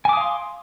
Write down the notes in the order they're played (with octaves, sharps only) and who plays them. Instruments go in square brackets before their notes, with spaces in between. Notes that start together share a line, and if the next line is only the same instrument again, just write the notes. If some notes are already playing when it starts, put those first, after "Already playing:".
[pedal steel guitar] G#5
D6
D#6
F5
C6